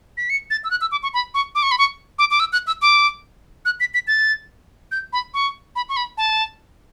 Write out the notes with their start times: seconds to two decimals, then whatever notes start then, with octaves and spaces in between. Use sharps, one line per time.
0.17 B6
0.30 C#7
0.50 A6
0.64 E6
0.71 F#6
0.81 E6
0.92 D6
1.03 C#6
1.14 B5
1.34 C#6
1.55 D6
1.63 C#6
1.71 B5
1.78 C#6
2.19 D6
2.31 D6
2.40 E6
2.53 F#6
2.67 E6
2.82 D6
3.65 F#6
3.80 B6
3.94 B6
4.08 A6
4.92 G6
5.13 B5
5.34 C#6
5.76 B5
5.89 C#6
5.97 B5
6.18 A5